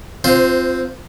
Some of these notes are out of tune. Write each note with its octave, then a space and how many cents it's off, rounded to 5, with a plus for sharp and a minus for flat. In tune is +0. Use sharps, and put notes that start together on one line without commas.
C4 +0 F4 +0 C5 -25